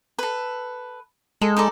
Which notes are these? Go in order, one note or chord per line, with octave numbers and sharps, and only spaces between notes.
A4 B4
G#3 A4
D#4 A4 D5